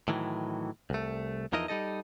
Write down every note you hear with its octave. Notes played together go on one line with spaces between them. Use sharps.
A2 D#3 E3 F#3
C2 A3
E2 F3 D#4 E4 A#4 D#5
G3 D#4 A4 D#5